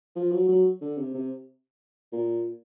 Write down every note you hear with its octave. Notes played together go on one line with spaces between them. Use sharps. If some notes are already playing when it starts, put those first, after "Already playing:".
F3
F#3
F#3
D3
C3
C3
A#2